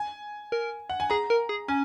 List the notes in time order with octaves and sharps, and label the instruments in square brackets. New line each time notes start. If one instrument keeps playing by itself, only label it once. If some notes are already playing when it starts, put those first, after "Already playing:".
Already playing: [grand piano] G#5
[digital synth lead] A#4
[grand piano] F#5
G#5
[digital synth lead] G#4 [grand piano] A#5
[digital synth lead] A#4
G#4
[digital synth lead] C#4 [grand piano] G#5